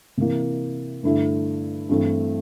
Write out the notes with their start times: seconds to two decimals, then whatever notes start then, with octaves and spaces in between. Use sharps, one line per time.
0.18 C3 E3 A#3 E4
1.03 G2 D3 A3 E4
1.89 G2 E3 A3 C4 E4